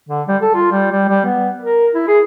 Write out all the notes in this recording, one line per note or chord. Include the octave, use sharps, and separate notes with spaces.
D3
G3
A4
F4
G3
G3
G3
B3
A#4
E4
G#4